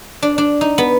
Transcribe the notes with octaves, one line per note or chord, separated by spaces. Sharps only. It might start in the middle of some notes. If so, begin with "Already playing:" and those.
D4
D4
D#4
B3